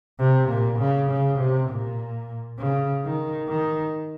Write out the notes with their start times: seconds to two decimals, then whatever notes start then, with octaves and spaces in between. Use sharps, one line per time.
0.19 C3
0.49 A#2
0.79 C#3
1.10 C#3
1.38 C3
1.69 A#2
2.59 C#3
3.03 D#3
3.48 D#3